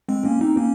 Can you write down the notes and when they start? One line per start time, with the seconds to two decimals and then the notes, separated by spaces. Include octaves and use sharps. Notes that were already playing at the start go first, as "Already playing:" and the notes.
0.09 G#3 C4
0.25 A#3 C#4
0.41 C4 D#4
0.57 A#3 C#4